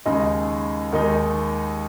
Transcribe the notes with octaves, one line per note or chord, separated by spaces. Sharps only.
D#2 C#3 G#3 D#4
D#2 D#3 G#3 D#4